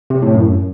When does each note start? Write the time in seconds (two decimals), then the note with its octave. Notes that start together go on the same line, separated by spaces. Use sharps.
0.10 C3
0.22 A2
0.34 F#2